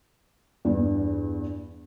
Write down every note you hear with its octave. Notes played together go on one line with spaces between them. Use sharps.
E2 G2